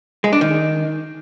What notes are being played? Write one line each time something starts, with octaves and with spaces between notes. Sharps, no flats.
G#3
D4
D#3